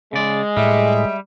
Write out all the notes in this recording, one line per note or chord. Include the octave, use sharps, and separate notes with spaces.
C#3 G#3 D5
A2 G3 E5